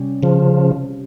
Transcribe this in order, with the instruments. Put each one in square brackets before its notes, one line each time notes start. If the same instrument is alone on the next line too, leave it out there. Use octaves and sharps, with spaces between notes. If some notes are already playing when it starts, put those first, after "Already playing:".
Already playing: [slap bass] C3 G3 C#4
[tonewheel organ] C#3 F3